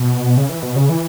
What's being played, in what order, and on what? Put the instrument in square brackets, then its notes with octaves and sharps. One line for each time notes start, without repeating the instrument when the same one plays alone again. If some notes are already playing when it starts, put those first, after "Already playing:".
Already playing: [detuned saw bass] B2
C#3
E3
B2
C#3
E3